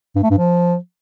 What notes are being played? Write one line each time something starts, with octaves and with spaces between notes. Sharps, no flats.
G2
A3
G2
F3